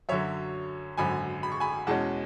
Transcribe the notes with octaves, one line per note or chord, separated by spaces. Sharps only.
F#2 D3 F#3 C#5 E5
G#1 F#2 D3 G#5 B5
B5
C#6
G#5 B5
E2 B2 G#3 C#4 F#5 A5